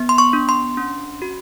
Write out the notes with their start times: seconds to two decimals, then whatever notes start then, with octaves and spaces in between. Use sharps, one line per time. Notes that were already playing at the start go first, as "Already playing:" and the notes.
Already playing: B3
0.09 C6
0.18 C#6
0.33 D4
0.49 C6
0.77 C#4
1.22 F#4